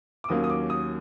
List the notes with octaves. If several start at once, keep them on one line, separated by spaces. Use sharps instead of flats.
D6
D#2 D#3 F#3 A#3 C#4 D#6
D#6
D6
D#6